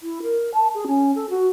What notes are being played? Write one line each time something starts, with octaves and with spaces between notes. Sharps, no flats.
E4
A#4
A5
G#4
C#4
A4
F#4